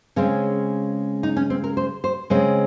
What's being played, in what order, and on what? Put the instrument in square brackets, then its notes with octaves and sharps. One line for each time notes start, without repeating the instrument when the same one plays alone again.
[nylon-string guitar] C#3 G#3 C4 C#4
D#4
C#4
C4
A#4
C5
C5
C#3 G#3 C4 D#5